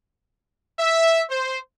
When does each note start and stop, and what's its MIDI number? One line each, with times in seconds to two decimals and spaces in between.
0.79 1.22 76
1.29 1.59 72